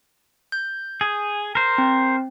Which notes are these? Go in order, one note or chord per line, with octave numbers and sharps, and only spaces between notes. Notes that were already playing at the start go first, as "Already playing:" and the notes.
G6
G#4
A#4 C5
C4